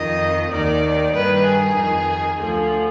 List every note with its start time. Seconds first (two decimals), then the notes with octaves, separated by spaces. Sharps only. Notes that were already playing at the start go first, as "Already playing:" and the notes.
Already playing: F2 D#3 D#5
0.51 D#2 D#3 D5
1.13 G2 D#3 B4
1.44 G#4
1.77 F2 D#3
2.39 D2 D3 F3 G#4